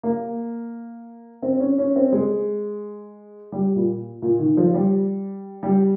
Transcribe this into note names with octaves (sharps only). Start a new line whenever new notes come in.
A#3
C4
C#4
C#4
C4
G#3
G3
A#2
A#2
D#3
F3
G3
G3